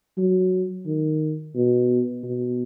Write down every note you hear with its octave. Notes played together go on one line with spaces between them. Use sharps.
F#3
D#3
B2
B2